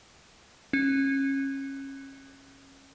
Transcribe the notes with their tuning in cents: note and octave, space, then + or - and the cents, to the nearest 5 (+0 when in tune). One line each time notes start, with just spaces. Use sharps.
C#4 -25